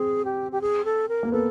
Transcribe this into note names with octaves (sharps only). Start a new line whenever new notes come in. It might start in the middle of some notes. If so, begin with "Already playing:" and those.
Already playing: C4 G#4
G4
G4
G#4
A4
A#4
A#3
B3 A4